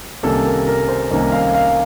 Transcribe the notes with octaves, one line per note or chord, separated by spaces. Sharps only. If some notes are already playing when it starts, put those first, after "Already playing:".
C2 C3 D#3 A#3 C#4 A4
A#4
A#4
C5
C2 C3 D#3 A#3 C#4 A#4
F5
F5